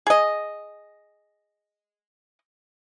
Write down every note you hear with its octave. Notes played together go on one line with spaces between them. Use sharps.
G#4 D#5